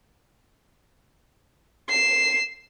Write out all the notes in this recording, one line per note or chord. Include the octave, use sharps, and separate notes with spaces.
C7 E7